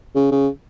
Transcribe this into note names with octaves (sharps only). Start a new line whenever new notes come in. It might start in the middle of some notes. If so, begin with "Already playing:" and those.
C#3
C#3